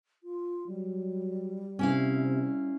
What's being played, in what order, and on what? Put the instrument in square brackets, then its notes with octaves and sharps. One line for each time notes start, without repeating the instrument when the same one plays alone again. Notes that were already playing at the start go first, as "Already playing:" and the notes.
[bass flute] F4
[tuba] F#3 [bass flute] G3
[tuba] C3 [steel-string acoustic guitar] C#4 E4 F5